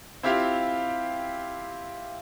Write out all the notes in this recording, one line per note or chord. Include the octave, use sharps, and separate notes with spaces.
C4 E4 F4 G4 E5 F5